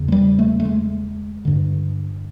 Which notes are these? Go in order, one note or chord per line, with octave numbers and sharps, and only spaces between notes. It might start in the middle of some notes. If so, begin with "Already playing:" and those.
Already playing: E2 C#3
G#3
G3
A3
A3
G#3
G2 D3